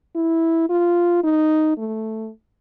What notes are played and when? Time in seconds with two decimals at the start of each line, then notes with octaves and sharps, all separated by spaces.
0.16 E4
0.70 F4
1.24 D#4
1.78 A3